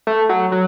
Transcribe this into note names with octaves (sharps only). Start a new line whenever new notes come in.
A3
F#3
F#3